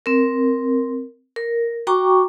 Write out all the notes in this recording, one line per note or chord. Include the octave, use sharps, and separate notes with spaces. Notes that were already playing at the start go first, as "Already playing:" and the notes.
C4 A#4
A#4
F#4 G5 A#5 C#6 D6